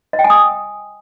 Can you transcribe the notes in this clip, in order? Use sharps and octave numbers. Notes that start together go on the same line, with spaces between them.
D#5
G5
G#5
D#6